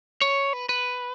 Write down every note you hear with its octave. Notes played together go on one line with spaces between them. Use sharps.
C#5
B4
B4